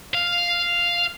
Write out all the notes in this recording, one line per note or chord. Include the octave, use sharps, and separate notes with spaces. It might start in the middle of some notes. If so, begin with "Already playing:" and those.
F5